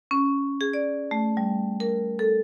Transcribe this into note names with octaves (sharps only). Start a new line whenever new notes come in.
C#4
G#4
D5
A3
G3
A#4
A4